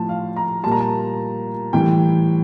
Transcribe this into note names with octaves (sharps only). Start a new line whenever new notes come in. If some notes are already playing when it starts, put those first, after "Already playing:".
Already playing: A2 F3 A5
F5
A#5
A#2 G3 A5
A#5
A5
A2 E3 G3 G5